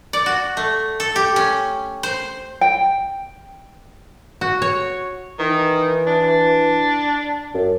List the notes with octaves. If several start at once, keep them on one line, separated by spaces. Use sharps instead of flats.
D5
F#4
A3
A4
G4
C#4
C5
G5
F#4
C#5
D#3 E3
D4
F#2